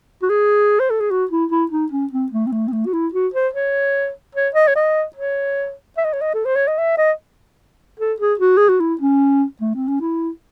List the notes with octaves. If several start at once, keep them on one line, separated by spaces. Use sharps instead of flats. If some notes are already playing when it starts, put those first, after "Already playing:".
F#4
G#4
C5
A4
G#4
F#4
E4
E4
D#4
C#4
C4
A3
C4
A3
C4
A3
F#4
E4
F#4
C5
C#5
C#5
D#5
C#5
D#5
C#5
E5
D#5
C#5
D#5
A4
C5
C#5
D#5
E5
D#5
A4
G#4
F#4
G#4
F#4
E4
C#4
A3
C4
C#4
E4